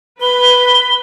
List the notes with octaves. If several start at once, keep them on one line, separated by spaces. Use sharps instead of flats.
B4 B5 G7